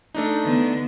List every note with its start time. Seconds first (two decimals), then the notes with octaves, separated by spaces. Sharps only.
0.15 A3 D4 D#4
0.43 D3 B3